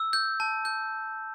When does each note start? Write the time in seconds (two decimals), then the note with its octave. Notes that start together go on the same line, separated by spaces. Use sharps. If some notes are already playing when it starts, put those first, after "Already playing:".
Already playing: E6
0.13 G6
0.40 A5
0.65 G6